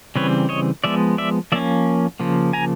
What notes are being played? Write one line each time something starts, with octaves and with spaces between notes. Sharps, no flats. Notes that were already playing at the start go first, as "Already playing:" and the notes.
C#3 E3 G3 C4 B4 C#5
C#5 D#5
F3 G#3 B3 D5 E5
D5 E5
F3 A#3 C#4 D5 E5
C#3 F3 A#3
G#5 A#5